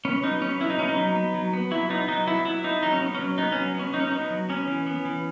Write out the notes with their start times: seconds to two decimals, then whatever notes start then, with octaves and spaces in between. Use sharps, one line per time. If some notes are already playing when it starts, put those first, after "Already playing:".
0.05 B3 C#4
0.23 F#3 D#4
0.41 B3 C#4
0.60 F#3 E4
0.70 D#4
0.78 B3 C#4
0.89 D#4
0.97 F#3
1.16 B3
1.34 F#3
1.53 B3
1.71 F#3 E4
1.89 B3 D#4
2.08 F#3 D#4
2.27 B3 E4
2.45 F#3 E4
2.64 B3 D#4
2.83 F#3 D#4
2.93 C#4
3.01 B3
3.15 F#3 C#4
3.38 B3 D#4
3.52 F#3 C#4
3.75 B3
3.80 C#4
3.93 F#3 D#4
4.00 C#4
4.07 B3 D#4
4.30 F#3
4.49 B3 C#4
4.68 E3
4.87 B3
5.05 E3